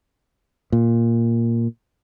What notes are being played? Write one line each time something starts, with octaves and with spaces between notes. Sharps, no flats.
A#2